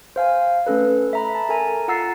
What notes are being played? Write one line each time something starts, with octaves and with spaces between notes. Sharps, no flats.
C5 F5 G#5
A3 C#4 A4 B4
E5 A#5 B5
A5
A4 A#4 G#5 A#5
F4 F#5 A#5 E6 A6 C7